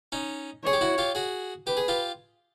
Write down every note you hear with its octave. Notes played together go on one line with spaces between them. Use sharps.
C#4 D#4
G#4 C#5
G4
E4 F#4
F4 G4
F#4 G#4
G4 B4
G#4
F4 G4